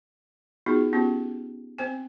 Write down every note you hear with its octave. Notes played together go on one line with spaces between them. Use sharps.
B3 D#4 F4 F#4 G#4
B3 C#4 F4 G4
C4 C5 G#5